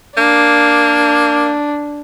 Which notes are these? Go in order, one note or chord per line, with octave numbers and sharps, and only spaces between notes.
A#3 D4